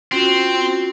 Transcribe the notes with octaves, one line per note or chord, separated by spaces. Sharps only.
C4 C#4 F4 F#4